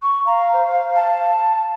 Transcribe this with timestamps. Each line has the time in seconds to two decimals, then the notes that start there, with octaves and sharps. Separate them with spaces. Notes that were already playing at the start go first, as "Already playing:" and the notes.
0.02 C#6
0.26 F5 A#5
0.53 C5
0.96 A5